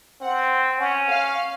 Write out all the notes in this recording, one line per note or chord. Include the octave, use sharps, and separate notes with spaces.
C4 F#5
C#4 F#5
F5